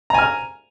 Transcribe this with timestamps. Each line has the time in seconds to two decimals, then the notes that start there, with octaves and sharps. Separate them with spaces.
0.10 A#5
0.14 G#5
0.19 F6